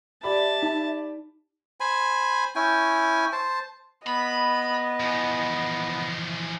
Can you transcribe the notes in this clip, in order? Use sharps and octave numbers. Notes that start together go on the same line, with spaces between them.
G4 D5 E5 A5 B5
D#4
C5 G#5 B5
C#4 E4 G5 G#5
C5 A5
B3 D#5 B5
E3 F3